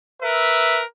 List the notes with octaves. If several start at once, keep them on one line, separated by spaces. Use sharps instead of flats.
A#4 B4 E5